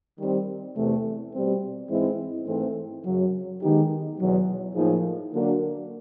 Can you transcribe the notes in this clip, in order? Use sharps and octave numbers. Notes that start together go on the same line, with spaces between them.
D#3 G3 C4
E2 C3 E3 A3
B2 G3 C4
G#2 E3 G#3 C4 E4
G#2 E3 A3 C4
F#2 C#3 F#3
D#3 G#3 B3 D#4 G4
E2 B2 F#3
A2 F3 A#3 D#4 G#4
D3 F#3 A#3 D4 F#4